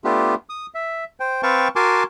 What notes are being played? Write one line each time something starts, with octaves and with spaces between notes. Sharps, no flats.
A3 B3 D4 F4 G4
D#6
E5
C5 G5
C4 B4 F5 G5 A5 C#6
F#4 A#4 G#5 A5 C6 D6